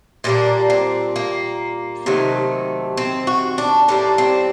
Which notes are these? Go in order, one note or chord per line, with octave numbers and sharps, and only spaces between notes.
A#2 G3 A#3 D4
C4
A#3
C3 D#3 F#3 A3
C4
F#4
D4
A2 G3 A#3 D4
C4